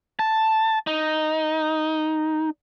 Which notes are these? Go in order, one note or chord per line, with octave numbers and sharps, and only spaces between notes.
A5
D#4